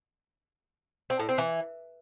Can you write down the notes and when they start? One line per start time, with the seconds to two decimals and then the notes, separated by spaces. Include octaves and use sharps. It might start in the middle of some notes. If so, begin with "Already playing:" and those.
1.10 C4
1.19 A2
1.29 C4
1.38 E3